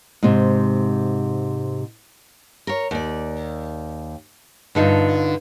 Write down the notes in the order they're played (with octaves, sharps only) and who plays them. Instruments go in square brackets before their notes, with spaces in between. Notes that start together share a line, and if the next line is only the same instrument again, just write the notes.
[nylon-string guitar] G#2 C3
A#4 C#5
D#2 D5
G2 D3 D#4 F4